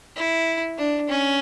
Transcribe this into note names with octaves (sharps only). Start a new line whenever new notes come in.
E4
D4
C#4